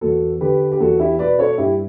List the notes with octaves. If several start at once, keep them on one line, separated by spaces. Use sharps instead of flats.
E2 F#4 A4
D3 G4 B4
G4
E2 F#4 A4
E4 G4
B2 B4 D5
A4 C#5
G2 E4 G4